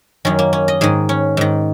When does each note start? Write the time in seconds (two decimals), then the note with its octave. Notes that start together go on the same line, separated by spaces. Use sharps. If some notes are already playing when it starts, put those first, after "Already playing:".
0.25 F#2 D#3 C#4
0.39 A#3
0.53 C#4
0.68 D#5
0.81 G#2 D#3 G#4
1.09 C#4
1.37 G#2 D#3